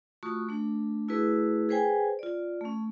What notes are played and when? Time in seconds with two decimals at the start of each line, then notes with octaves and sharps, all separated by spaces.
0.23 A3 F4 F#4 C#6 D#6
0.49 A3 D4
1.08 A3 E4 F#4 G#4 B4 E6
1.69 G#4 B4 C5 G5 G#5
2.19 F4 D5
2.61 A3 C#4